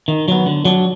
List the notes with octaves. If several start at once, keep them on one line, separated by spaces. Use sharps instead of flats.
D#3
F#3 B3
D3
F#3 D4